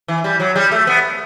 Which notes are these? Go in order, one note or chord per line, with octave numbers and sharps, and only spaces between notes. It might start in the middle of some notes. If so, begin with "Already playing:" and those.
E3
G3
F#3
G3
A3
B3